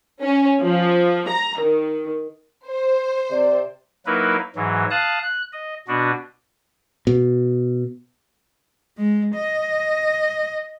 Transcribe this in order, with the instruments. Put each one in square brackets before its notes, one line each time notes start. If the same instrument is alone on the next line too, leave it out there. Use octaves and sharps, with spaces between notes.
[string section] C#4
F3
A#5
D#3
C5
[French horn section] C3 D5
[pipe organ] F#3 A#3 D#4 E4 A#4 B4
G#2 E3 F#3
F5 A5 D#6 F#6
F#6
D#5
B2 B3 D4 F#4
[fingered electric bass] B2
[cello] G#3
D#5